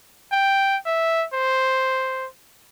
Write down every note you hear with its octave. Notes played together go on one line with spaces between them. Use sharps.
G5
E5
C5